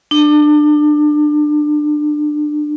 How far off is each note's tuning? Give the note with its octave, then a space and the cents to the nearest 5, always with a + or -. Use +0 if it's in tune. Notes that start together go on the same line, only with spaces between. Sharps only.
D4 +25